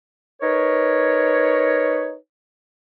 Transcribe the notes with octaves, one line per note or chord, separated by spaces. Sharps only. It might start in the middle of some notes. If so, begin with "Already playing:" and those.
D#4 A#4 B4 C#5